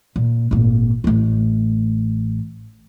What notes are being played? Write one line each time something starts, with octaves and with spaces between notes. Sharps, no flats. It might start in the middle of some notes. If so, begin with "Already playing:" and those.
A#2
G#1 A#2
A1 A3